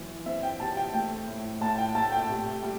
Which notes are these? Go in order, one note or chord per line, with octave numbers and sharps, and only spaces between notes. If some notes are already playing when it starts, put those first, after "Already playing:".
Already playing: F#2 E3
C4 E5
G5
C3 A5
G5
A3 G5
A2
A2 A5
G5
A3 A5
G5
C3
G3